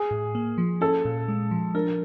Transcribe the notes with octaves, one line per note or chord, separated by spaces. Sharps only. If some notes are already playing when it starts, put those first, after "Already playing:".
Already playing: G#4
A2
A#3
F3
C#4 A4
A#2
G#3
F3
D4 A#4